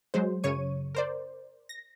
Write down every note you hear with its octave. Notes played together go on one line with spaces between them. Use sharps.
F#3 G#3 C5
F#2 C#3 C#5 C#6 D#7
A#4 C5 D5
A#6